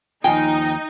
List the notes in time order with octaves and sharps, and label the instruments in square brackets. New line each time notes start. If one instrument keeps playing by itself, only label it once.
[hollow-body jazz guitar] D#2 F3 G#5 [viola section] D#4 [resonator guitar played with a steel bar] G5